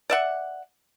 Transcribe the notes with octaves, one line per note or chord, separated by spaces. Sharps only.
D5 E5 F#5